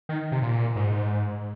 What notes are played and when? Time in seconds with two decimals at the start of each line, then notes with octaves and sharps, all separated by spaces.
0.09 D#3
0.32 C3
0.42 A#2
0.76 G#2